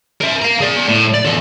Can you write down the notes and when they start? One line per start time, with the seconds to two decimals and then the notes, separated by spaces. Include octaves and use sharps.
0.21 A#4 E5
0.42 F5 A#5
0.61 G#4 D5
0.88 A2
1.14 D5
1.25 E2 A4